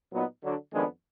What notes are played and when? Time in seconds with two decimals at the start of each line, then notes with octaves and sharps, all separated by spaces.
0.12 A#2 F#3 B3 D#4
0.41 D3 F#3 D4
0.72 F2 D#3 G#3 B3 D4